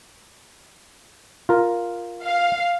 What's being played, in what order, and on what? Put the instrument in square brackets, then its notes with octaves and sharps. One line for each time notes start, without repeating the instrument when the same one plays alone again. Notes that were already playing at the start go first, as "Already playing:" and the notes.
[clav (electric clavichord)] F4 A#4
[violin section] F5